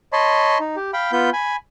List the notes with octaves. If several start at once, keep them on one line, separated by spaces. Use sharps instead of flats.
C#5 D#5 A5 B5 C6
D#4
G4
F5 G5 B5
B3 F4 B5 G6
G#5 B5